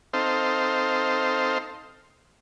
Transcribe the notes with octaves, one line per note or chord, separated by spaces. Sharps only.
C4 D#4 A4 C5 F5